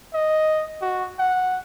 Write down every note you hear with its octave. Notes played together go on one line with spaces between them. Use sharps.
D#5
F#4
F#5